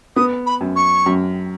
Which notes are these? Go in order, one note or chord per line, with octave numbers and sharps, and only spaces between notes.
B3 D#6
B5
F#2
C#6
F#2